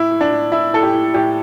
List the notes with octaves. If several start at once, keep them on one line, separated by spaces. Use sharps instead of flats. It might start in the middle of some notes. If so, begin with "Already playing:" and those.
Already playing: A2 E4
A2
D4
A2
A2 E4
A2 A4
G4
A2
A2 G4